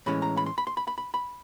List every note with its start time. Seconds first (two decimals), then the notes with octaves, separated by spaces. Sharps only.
0.06 A2 E3 G#3 C#4 B5
0.22 A#5
0.37 B5
0.46 C6
0.58 B5
0.67 C6
0.77 B5
0.87 B5
0.98 B5
1.14 B5